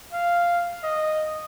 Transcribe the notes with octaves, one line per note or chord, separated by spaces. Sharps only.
F5
D#5